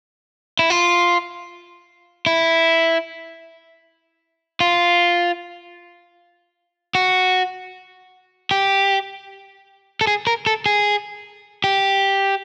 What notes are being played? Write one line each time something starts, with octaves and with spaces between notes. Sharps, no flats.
E4
F4
E4
F4
F#4
G4
A4
G#4
A#4
A4
G#4
G4